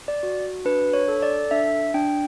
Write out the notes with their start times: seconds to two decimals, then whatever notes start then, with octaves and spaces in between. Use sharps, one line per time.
0.08 D5
0.23 F#4
0.65 D4 B4
0.93 C#5
1.08 A4
1.22 D5
1.51 D4 E5
1.94 D4 G5